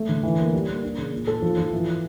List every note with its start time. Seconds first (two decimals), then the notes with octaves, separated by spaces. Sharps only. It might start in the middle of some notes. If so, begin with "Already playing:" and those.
Already playing: A3
0.09 D3
0.23 E3
0.38 A#3
0.53 G3
0.68 A#3
0.83 D4
0.98 C#3
1.12 A#2
1.27 A4
1.42 F3
1.57 F3
1.72 E3